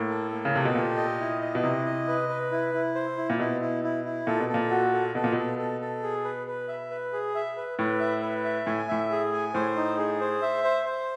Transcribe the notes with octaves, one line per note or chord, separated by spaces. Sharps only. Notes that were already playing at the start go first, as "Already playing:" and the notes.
Already playing: A2 A#3
A4
A#3
C#3
C3 A4
B2
A#2 G4
D#5
E4
D#5
B2
C3 E4
D#5
B4
B4
E4
E4
C5
E4
A#2
B2 E4
E4
E4
E4
A#2 A4
B2
A4
A#2
F#4
A4
B2 A4
A#2
B2 A4
A4
A4
G#4
B4
B4
E5
B4
G#4
E5
B4
A2 B4
E5
B4
E5
A2 G#5
A2 E5
G#4
G#5
A2 C5
D#4
G#4
C5
E5
C5
C5